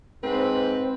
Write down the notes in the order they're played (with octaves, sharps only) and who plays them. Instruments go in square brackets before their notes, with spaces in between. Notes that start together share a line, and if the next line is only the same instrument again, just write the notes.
[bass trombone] G#2 [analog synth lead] C4 [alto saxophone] B4